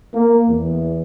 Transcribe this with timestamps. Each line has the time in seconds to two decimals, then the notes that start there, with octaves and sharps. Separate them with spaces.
0.14 A#3
0.49 E2